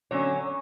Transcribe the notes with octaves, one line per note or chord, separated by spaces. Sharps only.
D3 F#3 C#4 C#5